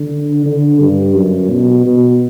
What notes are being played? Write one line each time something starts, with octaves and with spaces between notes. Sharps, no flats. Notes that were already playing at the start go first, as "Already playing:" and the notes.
Already playing: D3
D3
G2
F#2
B2
B2